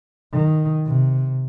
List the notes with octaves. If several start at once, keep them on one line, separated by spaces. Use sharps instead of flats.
D#3
C3